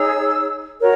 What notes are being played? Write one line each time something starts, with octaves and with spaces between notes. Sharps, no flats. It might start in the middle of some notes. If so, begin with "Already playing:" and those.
Already playing: D#4 G#4 C#5 E6
F#4 A#4 C#5